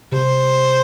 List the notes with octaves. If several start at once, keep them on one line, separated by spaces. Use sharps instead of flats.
C3 C5